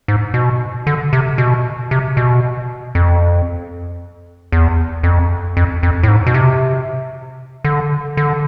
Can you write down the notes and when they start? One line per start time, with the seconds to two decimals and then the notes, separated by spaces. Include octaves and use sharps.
0.08 G#2
0.34 B2
0.87 D3
1.13 C3
1.38 B2
1.91 C3
2.17 B2
2.95 F2
4.52 E2
5.03 F2
5.57 F2
5.83 F2
6.03 A2
6.08 G#2
6.27 B2
6.34 C3
7.65 D3
8.17 D3